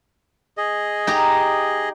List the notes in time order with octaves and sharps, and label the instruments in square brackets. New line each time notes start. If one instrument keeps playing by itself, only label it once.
[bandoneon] G#4 D#5
[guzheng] D#4 G4 A#5